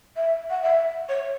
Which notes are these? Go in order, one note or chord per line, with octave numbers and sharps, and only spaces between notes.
E5
F#5
E5
C#5